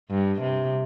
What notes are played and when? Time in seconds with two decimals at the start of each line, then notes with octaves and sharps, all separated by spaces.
0.10 G2
0.41 C3